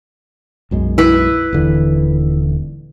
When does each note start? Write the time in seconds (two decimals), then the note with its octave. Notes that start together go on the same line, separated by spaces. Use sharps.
0.71 B1 F#2 G#3
0.98 E4 B4
1.53 D#1 D3 E3